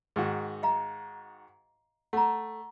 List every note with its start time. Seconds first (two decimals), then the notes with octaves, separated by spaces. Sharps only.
0.16 G#2 D#3 F#4
0.63 D#5 F5 A#5
2.13 A3 F#5 A#5